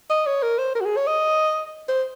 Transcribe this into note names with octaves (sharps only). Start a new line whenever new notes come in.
D#5
C#5
A#4
C5
A#4
F#4
G#4
C#5
D#5
C5